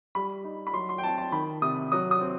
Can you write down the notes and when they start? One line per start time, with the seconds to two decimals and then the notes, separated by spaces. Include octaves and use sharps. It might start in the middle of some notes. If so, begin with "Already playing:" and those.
0.15 G3 B5
0.44 D#4
0.67 B5
0.73 F#3 C6
0.89 C6
0.98 G5
1.03 C4 A5
1.18 A5
1.32 D#3 B5
1.62 C3 D#6
1.92 F#3 D#6
2.11 D#6
2.21 C4